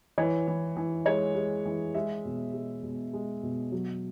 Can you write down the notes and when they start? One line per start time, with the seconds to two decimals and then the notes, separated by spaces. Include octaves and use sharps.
0.18 E3 C#5
0.48 E3
0.77 E3
1.06 G#3 C#5
1.35 G#3
1.66 E3
1.94 G#3 E5
2.25 B2
2.54 G#3
2.83 B2
3.13 G#3
3.43 B2
3.72 F#3